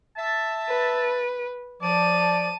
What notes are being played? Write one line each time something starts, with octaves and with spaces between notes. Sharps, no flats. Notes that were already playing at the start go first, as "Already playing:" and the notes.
E5 A5
B4
F3 D5 A5 D#7